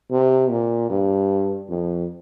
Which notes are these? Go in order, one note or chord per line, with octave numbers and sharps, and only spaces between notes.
C3
A#2
G2
F2